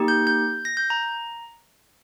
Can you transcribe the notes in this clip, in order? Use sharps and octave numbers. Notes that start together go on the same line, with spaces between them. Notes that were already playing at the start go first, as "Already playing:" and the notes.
Already playing: A#3 D#4 G4
G6
G6
A#6
G6
A#5